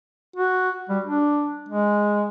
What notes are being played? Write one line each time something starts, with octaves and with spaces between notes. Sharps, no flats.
F#4
G3
D4
G#3